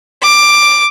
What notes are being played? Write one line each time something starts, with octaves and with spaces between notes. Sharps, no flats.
D6